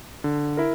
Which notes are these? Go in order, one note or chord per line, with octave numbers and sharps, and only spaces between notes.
D3
E4 A#4